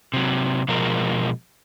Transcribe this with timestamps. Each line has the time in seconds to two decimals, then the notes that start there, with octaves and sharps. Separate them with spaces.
0.14 C3 F#3
0.68 B2 F3 G#3 A#4